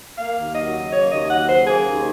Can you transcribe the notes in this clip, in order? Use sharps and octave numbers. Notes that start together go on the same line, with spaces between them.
A#3 F5
D#2
F#3 D#5
C#3
A#3 C#5
D#2 D#5
F#3 F#5
C#3 C5
A#3 G#4
D#2